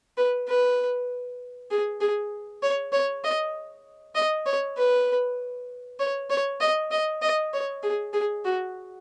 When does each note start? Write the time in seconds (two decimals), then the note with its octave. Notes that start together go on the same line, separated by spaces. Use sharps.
0.17 B4
0.49 B4
1.71 G#4
2.01 G#4
2.63 C#5
2.92 C#5
3.24 D#5
4.15 D#5
4.46 C#5
4.77 B4
6.00 C#5
6.30 C#5
6.60 D#5
6.91 D#5
7.22 D#5
7.53 C#5
7.83 G#4
8.13 G#4
8.45 F#4